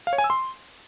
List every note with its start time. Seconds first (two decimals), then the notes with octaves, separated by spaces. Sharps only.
0.07 F5
0.13 C#5
0.18 G#5
0.24 E6
0.30 C6